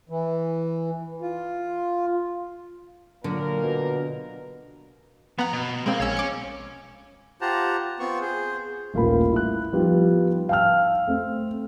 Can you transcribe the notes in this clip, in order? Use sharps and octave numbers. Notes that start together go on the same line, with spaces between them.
E3
F4
A#2 D3 F#3 A#4
B2
F3 B3 F#5 A#5
B2
G#3 C4 A#4 F5
A#1 C#5 G#5 E6
D6 C#7
F4 G4 C5 F#5 A5 A#5
B3 C4 F4 C#6
G#4 C5
D#1 A1 F4 A#4 B5
E4 F#6
F3 G3 B3 D#4 F4
F5 G5 A5 E6 F6
A3 C4